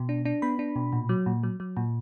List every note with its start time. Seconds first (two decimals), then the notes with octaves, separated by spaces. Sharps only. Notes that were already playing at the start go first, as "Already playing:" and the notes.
Already playing: B2
0.09 D4
0.25 D4
0.42 B3 B5
0.59 D4
0.76 B2
0.93 A#2
1.09 F#3
1.26 A#2
1.43 F#3
1.60 F#3
1.77 A#2